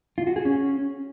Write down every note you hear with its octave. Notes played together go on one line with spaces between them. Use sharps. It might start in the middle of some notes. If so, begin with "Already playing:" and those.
F4
F#4
G#4
C#4